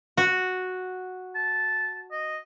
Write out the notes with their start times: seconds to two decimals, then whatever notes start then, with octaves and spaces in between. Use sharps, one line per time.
0.17 F#4
1.35 A5
2.11 D#5